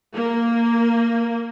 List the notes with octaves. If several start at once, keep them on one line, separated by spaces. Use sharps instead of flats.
A#3